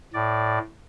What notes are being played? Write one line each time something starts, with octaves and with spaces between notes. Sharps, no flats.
A2 D5